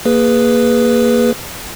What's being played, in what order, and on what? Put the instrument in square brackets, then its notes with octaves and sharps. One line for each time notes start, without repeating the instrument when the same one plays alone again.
[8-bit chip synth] A#3 G#4 B4